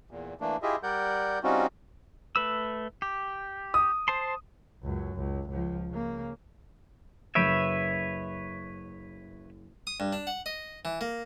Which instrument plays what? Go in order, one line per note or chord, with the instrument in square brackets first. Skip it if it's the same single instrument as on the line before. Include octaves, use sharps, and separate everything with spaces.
[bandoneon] E2 A#2
E3 A3 A#3 D4
E4 F4 G4 G#4 D#5 E5
G3 A#4 D5 F#5 G6
G3 C4 C#4 D#4 F4 F#4
[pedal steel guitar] A3 B4 E6
G4
[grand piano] D#6
[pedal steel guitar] C5 A5 C6
[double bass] C#2 F#2
C#2
C#2 F3
C#3 A#3
[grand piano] F#1 G6 D7 [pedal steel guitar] B4 C#5 E5
[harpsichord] D#6
G2
D4
F#5
D#5
E3
A#3